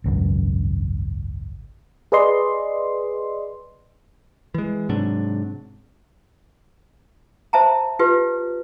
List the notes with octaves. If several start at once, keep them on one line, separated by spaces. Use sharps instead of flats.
G#1 C#2 F#2
G#4 B4 D5 D#5 C6
E3 G#3
G#2 C3 F#3 D4
C5 E5 A5 A#5
F4 G4 B4